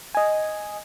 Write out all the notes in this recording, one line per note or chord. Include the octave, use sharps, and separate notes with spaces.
D#5 G#5